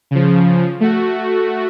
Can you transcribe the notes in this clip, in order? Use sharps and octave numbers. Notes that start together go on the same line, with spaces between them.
C#3 F3
A3 F#4